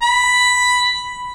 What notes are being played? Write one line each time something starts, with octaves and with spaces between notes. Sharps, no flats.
B5